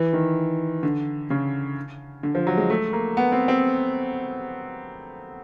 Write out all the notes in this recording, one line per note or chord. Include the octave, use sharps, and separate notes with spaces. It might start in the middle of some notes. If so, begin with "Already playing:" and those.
Already playing: E3
D#3
D3
C#3
D3
F3
F#3
G#3
A3
A#3
B3
C4
C4